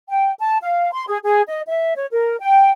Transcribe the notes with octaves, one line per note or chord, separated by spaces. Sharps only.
G5
A5
F5
C6
G#4
G#4
D#5
E5
C#5
A#4
G5